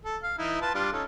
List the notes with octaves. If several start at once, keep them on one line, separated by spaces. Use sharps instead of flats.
A4
F5
E3 D#4 E4
F4 B4 A5
G3 D4 F4
C#4 D#4 A4